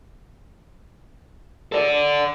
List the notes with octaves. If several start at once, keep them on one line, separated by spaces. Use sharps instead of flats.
A4 D5